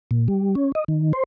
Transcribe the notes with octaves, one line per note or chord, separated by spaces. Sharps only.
A#2
G3
C#4
D#5
D#3
C5